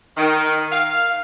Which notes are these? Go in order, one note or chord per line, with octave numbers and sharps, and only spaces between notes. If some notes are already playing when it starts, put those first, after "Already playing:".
D#3
F5